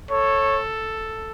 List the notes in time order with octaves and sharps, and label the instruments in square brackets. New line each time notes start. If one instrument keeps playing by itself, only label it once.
[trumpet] A4 [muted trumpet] C#5